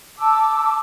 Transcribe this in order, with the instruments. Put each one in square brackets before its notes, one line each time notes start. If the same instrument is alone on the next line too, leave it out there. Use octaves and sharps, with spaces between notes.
[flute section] A5 D6 E6